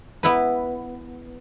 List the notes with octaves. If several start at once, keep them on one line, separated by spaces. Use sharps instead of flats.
B3 E4 B4